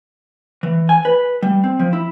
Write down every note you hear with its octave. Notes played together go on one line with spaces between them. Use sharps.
E3
G#5
B4
G3
C4
F3
E4